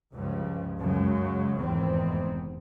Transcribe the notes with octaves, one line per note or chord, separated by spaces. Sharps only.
C#2 G2 C#3 F3
F#2 C#3 F#3 G#3
F1 E2 G#2 D#3 C4